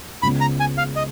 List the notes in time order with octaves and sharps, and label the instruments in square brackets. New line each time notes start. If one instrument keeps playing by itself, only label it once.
[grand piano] C#2 C#3 G#3 B3 [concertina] B5
[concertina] A#5
G#5
F5
D#5